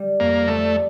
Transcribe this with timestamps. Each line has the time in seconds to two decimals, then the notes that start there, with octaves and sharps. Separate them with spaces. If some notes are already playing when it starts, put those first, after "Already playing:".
Already playing: G3
0.20 F2 A#3
0.48 G3 A3